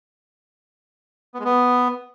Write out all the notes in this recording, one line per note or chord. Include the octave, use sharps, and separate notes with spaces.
B3
G#3
B3